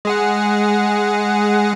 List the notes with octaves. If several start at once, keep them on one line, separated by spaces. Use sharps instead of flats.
G#3 G#4 F#5